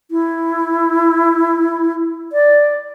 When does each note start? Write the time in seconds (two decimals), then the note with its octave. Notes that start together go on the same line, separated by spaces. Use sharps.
0.11 E4
2.32 D5